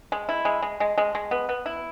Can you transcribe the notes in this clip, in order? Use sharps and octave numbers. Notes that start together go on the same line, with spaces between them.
G#3
E4
G#3
G#3
G#3
G#3
G#3
B3
B3
E4